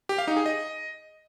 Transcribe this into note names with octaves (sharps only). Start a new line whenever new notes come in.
G4
F5
D#4
G#4
D#5